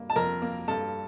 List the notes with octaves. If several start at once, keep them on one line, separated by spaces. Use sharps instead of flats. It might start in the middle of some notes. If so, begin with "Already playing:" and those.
Already playing: G2 A#3
A5
F2 A#4 A#5
A#3
G2 A4 A5